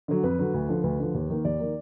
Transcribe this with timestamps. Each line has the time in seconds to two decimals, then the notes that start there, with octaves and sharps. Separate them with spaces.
0.08 D3 F#3
0.23 F2 B4
0.39 D3 F#3
0.54 D2
0.69 D3 F3
0.83 D2 B4
0.99 D3 F3
1.14 D#2
1.30 D#3 A#3
1.45 D#2 D5
1.60 D#3 A#3